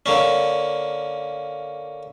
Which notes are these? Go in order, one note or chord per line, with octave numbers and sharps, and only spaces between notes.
D3 A#3 C#4